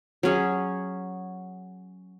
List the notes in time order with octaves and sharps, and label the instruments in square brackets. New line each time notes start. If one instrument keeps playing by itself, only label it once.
[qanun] F#3 C#4 G#4